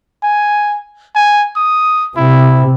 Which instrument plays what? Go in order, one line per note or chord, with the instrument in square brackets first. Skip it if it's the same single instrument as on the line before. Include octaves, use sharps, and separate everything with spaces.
[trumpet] G#5
G#5
D#6
[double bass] C3 [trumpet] E4